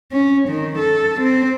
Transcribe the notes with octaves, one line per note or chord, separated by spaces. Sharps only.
C#4
D#3
A4
C4